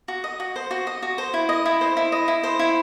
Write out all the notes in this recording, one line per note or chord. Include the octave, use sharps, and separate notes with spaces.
F#4
D#5
F#4
C5
F#4
D#5
F#4
C5
E4
D#5
E4
C5
E4
D#5
E4
C5
E4